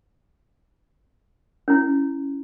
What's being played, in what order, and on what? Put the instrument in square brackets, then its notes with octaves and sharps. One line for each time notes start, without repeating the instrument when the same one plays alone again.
[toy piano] C#4 E4